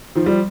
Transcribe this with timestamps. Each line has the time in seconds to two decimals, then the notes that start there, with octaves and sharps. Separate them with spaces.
0.15 D#3 F3
0.26 F3 G3